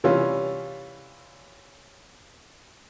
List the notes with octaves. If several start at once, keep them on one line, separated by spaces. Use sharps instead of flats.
C3 E3 G3 C#4 F4